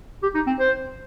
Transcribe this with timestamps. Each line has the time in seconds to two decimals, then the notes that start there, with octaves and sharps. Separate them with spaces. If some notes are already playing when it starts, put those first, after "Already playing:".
0.22 G4
0.35 D#4
0.46 C4
0.59 C5